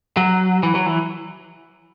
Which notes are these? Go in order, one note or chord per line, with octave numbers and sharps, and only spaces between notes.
F#3
E3
F#3
E3